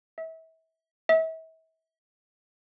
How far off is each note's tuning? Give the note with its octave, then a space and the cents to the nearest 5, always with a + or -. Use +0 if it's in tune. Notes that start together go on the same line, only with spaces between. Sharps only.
E5 -30
E5 -35